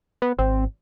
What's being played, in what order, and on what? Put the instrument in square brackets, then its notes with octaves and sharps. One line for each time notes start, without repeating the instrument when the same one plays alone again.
[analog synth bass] B3
[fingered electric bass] G#1 [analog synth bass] C4